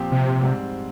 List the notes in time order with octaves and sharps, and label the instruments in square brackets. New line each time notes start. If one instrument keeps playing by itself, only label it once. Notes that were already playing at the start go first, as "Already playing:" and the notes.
Already playing: [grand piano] A#2 F3 C4 G4
[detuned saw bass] C3
[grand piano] G#2 G3 C4